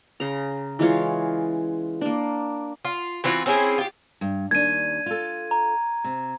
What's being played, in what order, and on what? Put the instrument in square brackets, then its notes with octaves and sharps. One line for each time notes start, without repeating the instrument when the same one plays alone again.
[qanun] C#3 A#5
E3 G#3 F4 C#5
A#3 D4
[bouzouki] F4
E3 C4 F4 F#4
C4 C#4 E4 G#4
F4 G4
[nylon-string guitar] G2
[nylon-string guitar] D#2 D4 [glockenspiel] G#6 D#7
[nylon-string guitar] F4 A4
[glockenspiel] A#5
[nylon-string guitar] C3